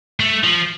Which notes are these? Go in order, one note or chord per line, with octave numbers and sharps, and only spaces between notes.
A3
F3